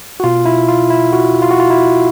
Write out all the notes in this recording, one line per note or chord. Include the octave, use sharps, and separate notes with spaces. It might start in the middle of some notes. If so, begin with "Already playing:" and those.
F#4
B2 F4
E4
F4
E4
F#4
F4
F#4
F4
E4